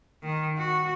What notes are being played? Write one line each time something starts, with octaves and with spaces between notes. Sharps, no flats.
D#3
F#4